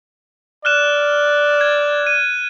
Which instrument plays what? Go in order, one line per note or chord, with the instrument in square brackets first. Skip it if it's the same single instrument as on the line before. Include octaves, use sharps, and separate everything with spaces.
[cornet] D5 [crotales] F6 F#6 E7
[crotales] G#6
D#7